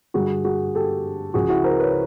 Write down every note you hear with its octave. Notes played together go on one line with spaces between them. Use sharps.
G2 D3 G3 F#4 G#4
F#4 G#4
G4 A4
C#2 C#3 F3 G#3 F#4 G#4
E4 F#4
A#4 C5
B4 C#5